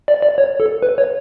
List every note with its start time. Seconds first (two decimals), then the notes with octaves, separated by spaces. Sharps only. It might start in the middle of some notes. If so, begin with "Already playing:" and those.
0.08 D5
0.22 D5
0.38 C#5
0.60 A4
0.83 B4
0.98 C#5